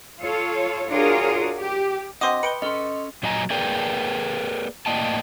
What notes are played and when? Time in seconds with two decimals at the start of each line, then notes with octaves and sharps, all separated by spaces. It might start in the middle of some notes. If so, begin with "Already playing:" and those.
0.21 F4 A4 C#5
0.90 D4 F4 F#4 G#4 A#4 C#5
1.60 G4
2.21 D3 C4 F#4 D#5 C6 D6 D#6
2.43 B4 G5 C#7 D7 G7
2.62 C#4 A4 D#5 C6
3.23 A#2 F#3 D#5 G#5 A#5
3.50 A#3 G#4 A#4 B4 D5 G5
4.86 A2 A#3 D5 D#5 G5 A5